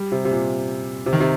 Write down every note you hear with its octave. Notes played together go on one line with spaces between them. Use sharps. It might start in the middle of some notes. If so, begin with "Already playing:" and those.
Already playing: G3
C3
C3
A#2
C3
D#3
C3